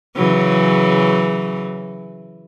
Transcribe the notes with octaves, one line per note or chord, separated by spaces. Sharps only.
C#3 E3 F#3